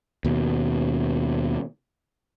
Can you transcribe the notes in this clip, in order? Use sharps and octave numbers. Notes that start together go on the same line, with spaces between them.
D#2 B2